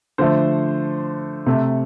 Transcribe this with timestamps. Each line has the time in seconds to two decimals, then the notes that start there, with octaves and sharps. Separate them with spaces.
0.18 D3 F3 A3 C5
1.46 C3 A3